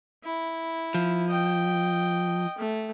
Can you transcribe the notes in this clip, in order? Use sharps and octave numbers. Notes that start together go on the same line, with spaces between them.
E4
F3
D#5 G5
A3